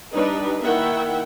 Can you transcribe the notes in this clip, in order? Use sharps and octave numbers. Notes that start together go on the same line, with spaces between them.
G3 D4 D#4 B4
D#3 A#3 E4 E5 F#5 G5